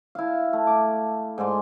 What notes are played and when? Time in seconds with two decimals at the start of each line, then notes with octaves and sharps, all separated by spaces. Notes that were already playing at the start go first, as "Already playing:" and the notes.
0.15 E4 F5
0.53 A3
0.67 D6
1.38 G#2 G#3 D5 C6